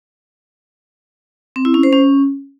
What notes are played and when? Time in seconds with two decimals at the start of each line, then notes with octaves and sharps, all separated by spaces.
1.56 C4
1.65 E4
1.74 C#4
1.83 C5
1.93 C#4